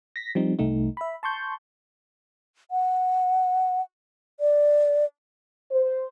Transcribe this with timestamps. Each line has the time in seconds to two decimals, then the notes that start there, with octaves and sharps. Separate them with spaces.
0.16 A#6 B6
0.35 F3 G3 C4 D#4
0.59 C2 A3 D#4
0.97 E5 B5
1.23 A5 C6 C#6 G6
2.71 F#5
4.40 D5
5.72 C5